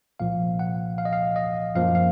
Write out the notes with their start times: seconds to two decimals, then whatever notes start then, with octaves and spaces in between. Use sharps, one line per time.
0.20 C2 A#2 F3 F5
0.59 F#5
0.98 F5
1.05 D#5
1.13 F5
1.36 D#5
1.75 F#2 F3 A#3 F5
1.95 F5